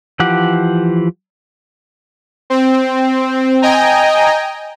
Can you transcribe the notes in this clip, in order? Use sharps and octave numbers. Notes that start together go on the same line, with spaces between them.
E3 F3 G4 F#5 D6
C4
D#5 G5 G#5 A#5